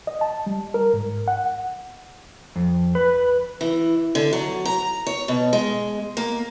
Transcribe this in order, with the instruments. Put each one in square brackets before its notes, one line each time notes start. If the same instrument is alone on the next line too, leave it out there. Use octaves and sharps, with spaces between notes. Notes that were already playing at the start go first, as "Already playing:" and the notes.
[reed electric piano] D#5
A5
G3
A#4
G#2
F#5
[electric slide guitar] F2
B4
[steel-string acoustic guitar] E3
D3
F#3
A#5
C#5
B2
G#3
A#3